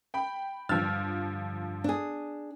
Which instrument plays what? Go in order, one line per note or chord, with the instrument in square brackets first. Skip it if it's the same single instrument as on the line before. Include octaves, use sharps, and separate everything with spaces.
[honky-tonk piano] G5 B5
[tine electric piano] G2 E6 A6 [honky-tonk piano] D3 F3 F6
[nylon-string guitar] D4 G#4